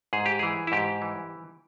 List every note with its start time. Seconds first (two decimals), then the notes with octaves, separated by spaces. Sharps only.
0.13 G#2 G#4
0.26 G4
0.39 E3 G#4
0.67 E4
0.72 G#2 G4
1.02 E3